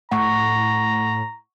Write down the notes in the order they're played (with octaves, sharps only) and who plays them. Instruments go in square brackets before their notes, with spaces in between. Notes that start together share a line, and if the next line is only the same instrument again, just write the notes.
[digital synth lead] A2 [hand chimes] F#5 C#6 [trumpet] A#5